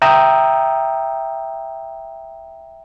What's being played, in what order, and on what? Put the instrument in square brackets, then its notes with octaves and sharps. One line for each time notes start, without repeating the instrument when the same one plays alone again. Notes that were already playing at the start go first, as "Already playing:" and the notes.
[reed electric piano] E5 G5 A#5 D#6 E6